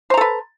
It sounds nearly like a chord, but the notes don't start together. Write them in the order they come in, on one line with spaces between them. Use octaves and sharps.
C5 A#5 A4 B4